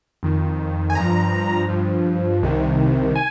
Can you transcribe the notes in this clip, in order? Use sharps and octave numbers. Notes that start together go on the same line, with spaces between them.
F2 D#3
G#5
G2 F3 A#5
G2 F3
C2 C3 D#3
G#5